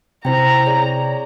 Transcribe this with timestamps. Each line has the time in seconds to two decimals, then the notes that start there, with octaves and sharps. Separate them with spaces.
0.25 C3 E4 C5 G5 A#5
0.66 G#4 C#5 D5